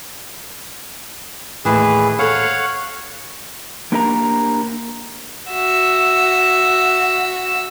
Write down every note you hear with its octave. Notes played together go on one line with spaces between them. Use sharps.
D#2 A2 E3 G#4 B4
A4 C5 C#5 F5 F#5
A#3 D4 G4 A#4 D5 A#5
F#4 E5